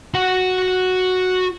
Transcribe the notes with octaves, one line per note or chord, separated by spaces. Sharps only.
F#4 F#5